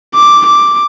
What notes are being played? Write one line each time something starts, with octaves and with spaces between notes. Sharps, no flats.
D6
D6